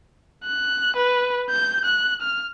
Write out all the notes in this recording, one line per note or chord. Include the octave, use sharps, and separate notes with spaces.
F#6
B4
G6
F#6
F6